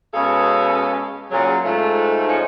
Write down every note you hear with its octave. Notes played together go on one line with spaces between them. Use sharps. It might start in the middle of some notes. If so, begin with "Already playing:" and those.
B2 G#3 C#4 G#4 A4 F5
A#2 C#3 F#3
G#2 A3 F4
F3 C#4 D#4 F4